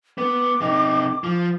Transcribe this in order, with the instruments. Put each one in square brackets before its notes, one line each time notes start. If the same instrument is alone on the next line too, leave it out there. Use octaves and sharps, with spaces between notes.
[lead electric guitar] B3 [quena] D6
[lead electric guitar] C3 D#4
F3